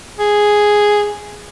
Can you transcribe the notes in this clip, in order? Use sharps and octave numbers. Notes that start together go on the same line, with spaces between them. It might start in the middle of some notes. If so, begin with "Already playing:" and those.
G#4